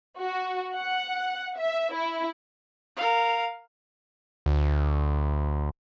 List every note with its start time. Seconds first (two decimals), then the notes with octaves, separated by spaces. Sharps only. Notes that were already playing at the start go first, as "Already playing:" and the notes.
0.17 F#4
0.75 F#5
1.58 E5
1.94 E4
2.96 A#4 F5
4.46 D2